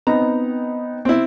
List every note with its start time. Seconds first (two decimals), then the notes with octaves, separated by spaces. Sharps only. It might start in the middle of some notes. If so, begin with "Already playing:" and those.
0.07 B3 C4 D#4 A#5
1.05 C4 E4